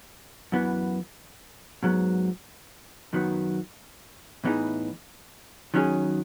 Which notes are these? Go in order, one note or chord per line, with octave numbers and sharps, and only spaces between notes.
F#2 E3 B3
G#2 F#3 B3
F#2 D#3 F#3 B3
A2 E3 B3 D#4 G#4
D#3 F#3 C#4 G#4